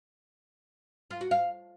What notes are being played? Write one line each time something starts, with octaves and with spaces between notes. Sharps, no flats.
F4
F#4
F5